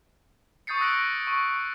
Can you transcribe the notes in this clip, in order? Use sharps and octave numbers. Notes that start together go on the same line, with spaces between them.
C#6 D#6 G6 A6 C7 C#7
E6 F#6 A#6 C#7 D7 F#7
C#6